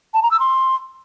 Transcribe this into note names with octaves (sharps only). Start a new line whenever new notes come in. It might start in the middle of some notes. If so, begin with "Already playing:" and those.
A5
A#5
E6
C6